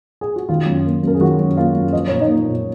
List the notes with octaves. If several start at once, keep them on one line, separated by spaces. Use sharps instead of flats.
G#4
F#4
D#3 F4
F#2
A#3
F#2 A#4
G#4
D#3 F#3 F#4
F#2
A#3 F4 F5
F#2
F3 D#5
A#2 C#5
D#4 D#5
A#3
A#2